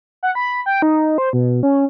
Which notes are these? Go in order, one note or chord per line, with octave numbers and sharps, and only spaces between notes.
F#5
B5
G5
D#4
C5
B2
C#4